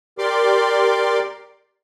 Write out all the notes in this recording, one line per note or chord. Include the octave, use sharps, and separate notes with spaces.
G4 A#4 D5 C6 D6